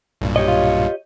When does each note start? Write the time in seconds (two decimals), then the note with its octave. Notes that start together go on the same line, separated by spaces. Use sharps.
0.21 B1 G2 A#2
0.36 G4 C#5 D#5
0.48 F4